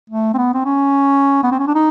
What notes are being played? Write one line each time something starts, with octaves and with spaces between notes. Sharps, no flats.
A3
C4
B3
C4
C#4
B3
C4
C#4
D4
D#4